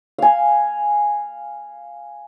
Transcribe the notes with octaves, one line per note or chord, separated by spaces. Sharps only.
F5 G#5